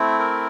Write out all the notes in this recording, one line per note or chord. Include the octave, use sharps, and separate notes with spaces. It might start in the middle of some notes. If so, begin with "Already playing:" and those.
Already playing: A3 C4 E4
A#4